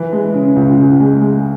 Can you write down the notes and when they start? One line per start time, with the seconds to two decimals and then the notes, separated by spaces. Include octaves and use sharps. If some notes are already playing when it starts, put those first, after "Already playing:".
Already playing: E3
0.13 G#3
0.34 C#3
0.56 C#2
0.79 C#2
1.00 G#3
1.22 G#3